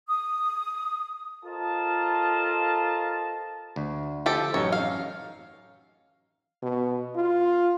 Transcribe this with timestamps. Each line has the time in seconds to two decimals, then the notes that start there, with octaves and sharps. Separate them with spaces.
0.08 D#6
1.45 F4 A4 A#4 C5 D#5 A5
3.76 D2
4.26 F3 G4 A4
4.54 A1 F#2 D#4 C#5
4.72 F5
6.63 B2
7.16 F4